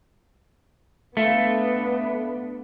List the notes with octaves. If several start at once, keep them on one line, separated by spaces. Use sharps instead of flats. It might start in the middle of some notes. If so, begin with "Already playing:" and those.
A3 B3 D4 F4